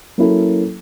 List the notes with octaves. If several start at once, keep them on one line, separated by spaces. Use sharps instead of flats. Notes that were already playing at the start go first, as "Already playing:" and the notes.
F#3 A#3 C#4 E4 A4